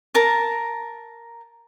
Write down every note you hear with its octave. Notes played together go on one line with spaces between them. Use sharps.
A#4 A5 A#5